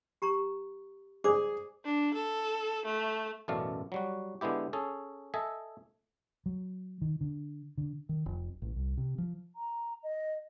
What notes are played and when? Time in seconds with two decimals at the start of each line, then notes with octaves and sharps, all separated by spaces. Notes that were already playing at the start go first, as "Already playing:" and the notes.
0.22 G4 A#5 C#6
1.24 G#4 C5 D5 D6
1.85 D4
2.14 A4
2.85 A3
3.48 A1 F#2 B2 A3 D5 F5
3.92 F#3 G3 F#4
4.41 D3 G#3 B3 E4 G4
4.73 C#4 G#4 A4
5.34 A4 D#5 E5 G#5
6.46 F#3
7.02 D#3
7.21 D3
7.78 D3
8.09 D#3
8.26 F1
8.62 A1
8.76 C2
8.97 C3
9.18 F3
9.56 A#5
10.03 D#5